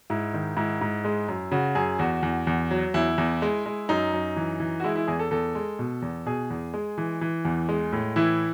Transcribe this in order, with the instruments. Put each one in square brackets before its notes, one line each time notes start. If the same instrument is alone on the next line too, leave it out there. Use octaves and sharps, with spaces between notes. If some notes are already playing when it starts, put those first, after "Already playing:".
[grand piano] G#2 E4
D#3
G#2 E4
G#2
G#3
F#2
C#3 F#4
F#2 G#4
E2 F#4
E2
E2
F#3
E2 E4
E2
G#3
G#3
F#2 D#4
F#2
E3
E3
F#4
G#3 E4
E4
E2 G#4
A4
E2 A4
G#3
B2
E2
B2 G#4
E2
G#3
E3
E3
E2
G#3
A2
E3 E4